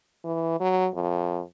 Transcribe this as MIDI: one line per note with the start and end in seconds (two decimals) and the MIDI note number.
0.25 0.57 52
0.61 0.89 54
0.95 1.42 41